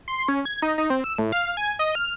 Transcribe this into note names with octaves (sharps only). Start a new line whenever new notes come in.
C6
C#4
G#6
D#4
D#4
C4
E6
A2
F5
G#5
D#5
F6